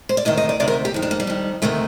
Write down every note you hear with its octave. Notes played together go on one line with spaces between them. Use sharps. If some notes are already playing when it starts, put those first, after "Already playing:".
C5
D5
D2 C3 D#3 D#5
D#5
D5
D2 C3 D#3 D5
A#4
G4
F2 D#3
D4
A#3
G3
F2 D#3
D2 C3 D#3 A3